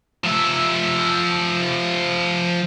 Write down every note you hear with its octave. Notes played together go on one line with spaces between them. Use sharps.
F3 E5